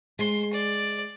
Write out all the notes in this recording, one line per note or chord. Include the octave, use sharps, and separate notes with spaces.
G#3 C6
D5